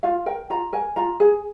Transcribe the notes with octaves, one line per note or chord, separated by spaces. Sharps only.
F4 F5
A#4 G5
F4 A#5
A#4 G#5
F4 A#5
G#4 G#5